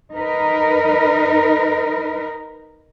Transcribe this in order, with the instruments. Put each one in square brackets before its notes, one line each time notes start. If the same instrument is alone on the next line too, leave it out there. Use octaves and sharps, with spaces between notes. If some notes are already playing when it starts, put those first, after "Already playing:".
[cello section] D#4 A#4 B4